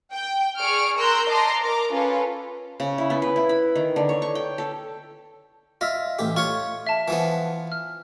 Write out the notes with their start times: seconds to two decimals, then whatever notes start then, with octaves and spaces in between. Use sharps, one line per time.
0.13 G5
0.57 G#4 D5 C#6 F6 D7
0.96 A#4 A#5 C6 E6 F#6 G6
1.28 D#5 A5 A#5 C6 D6
1.61 A#4 A#5 D6
1.91 C#4 F4 A4 B4
2.80 C#3
2.98 E4
3.10 B3
3.22 B4
3.36 E4
3.49 B5
3.75 D#3
3.96 D3
4.09 C#5
4.22 C#6
4.35 G5
4.58 A4
5.81 F4 D#5 E5 E6
6.19 A1 G4
6.36 F4 C#5 C#6
6.87 E5 A5
7.08 E3 F3 B3
7.72 F6